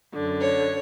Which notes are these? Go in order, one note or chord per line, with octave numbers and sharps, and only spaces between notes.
F#2 D3
C#5